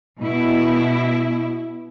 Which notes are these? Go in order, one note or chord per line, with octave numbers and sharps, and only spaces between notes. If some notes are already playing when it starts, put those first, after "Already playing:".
B2 E4